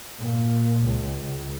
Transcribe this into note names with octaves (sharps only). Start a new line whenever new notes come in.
A#2
C#2
C#2